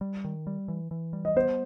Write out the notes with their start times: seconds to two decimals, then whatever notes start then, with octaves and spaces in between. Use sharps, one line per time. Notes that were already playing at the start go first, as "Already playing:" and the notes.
0.01 G3
0.24 D#3
0.47 G3
0.68 E3
0.91 E3
1.13 G3
1.25 D#5
1.36 B3 C5